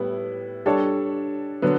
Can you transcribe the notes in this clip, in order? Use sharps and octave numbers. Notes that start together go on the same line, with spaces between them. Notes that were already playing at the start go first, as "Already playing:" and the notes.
Already playing: A2 G3 B3 E4
G3 D4 A4 C#5
D3 F#3 B3